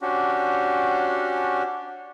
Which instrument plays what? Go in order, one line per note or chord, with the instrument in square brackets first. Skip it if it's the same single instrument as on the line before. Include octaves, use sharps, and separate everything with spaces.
[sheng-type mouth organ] C#4 D4 F#4 G4